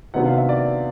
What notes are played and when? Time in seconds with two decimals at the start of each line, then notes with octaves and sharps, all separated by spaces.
0.14 C3 D#3 F#3 B3 D4 F#5
0.26 F5
0.38 E5
0.49 D5